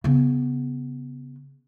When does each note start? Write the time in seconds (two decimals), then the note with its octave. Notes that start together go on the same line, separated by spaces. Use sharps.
0.04 C#3 B3